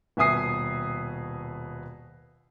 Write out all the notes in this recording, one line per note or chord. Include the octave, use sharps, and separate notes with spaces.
D#1 B2 E5 G#5 D#6 C7